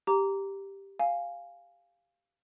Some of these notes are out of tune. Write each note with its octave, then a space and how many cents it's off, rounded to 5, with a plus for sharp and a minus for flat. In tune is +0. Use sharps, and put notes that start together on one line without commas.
G4 +0 A#5 +0 D6 -20
F5 +0 G#5 +0